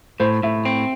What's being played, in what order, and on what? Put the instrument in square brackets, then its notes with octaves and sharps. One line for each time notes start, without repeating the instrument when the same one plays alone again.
[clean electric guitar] A2 [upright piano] C5
[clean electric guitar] A2 [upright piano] E5
[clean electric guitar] C4